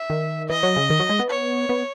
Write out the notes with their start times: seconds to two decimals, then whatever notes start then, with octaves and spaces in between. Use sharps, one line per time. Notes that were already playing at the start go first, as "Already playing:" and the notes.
Already playing: E5
0.10 D#3
0.49 E3 D#5
0.63 F#3
0.76 C#3
0.90 D#3
1.00 F#3
1.09 G#3
1.19 B3
1.30 C#5
1.69 B3